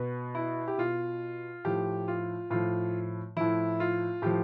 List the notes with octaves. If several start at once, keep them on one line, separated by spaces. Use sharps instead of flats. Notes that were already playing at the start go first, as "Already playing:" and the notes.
Already playing: B2 B4
E4
G4
B2 F4
A2 F3 G4
F4
A2 F3 F4
A2 F3 E4
F4
A2 F3 G4